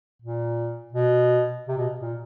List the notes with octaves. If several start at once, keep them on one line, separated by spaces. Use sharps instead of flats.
A#2
B2
C3
B2
A#2